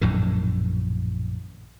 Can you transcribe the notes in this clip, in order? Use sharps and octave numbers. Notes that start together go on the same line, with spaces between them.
A#1 F#2 A2 D#3